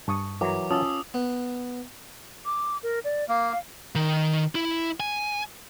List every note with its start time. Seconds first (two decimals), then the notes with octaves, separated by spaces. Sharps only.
0.08 G2 A5 C#6 D#6
0.41 E3 F#3 A#4 D6
0.71 C#4 F4 G#5 A5 D#6 E6
1.14 B3
2.45 D6
2.83 A#4
3.04 D5
3.29 A#3 F5
3.95 D#3
4.55 E4
5.00 G#5